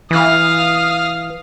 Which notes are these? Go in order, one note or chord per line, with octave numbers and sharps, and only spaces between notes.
E3 F5 D#6